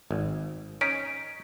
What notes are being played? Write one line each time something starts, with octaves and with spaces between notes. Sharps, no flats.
G#1
C#4 D#4 B6 D7